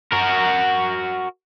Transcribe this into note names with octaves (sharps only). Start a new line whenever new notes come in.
F#4 A#4